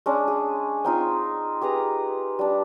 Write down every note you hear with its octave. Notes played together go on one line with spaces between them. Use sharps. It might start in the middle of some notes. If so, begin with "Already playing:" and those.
G#3 C#4 D4
G#4
C4 D#4 F4 G#5
G4 G#4 B4 A#5
G3 D4